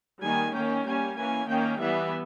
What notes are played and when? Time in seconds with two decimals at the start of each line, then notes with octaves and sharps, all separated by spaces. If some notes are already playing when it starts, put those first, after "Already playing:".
0.23 D#3 G3 A#3 G#5
0.55 D#3 A#3 C#4 G5
0.86 G3 A#3 C#4 G#5
1.18 E3 A#3 C#4 G#5
1.49 D#3 A#3 C#4 G5
1.81 E3 G3 B3 E5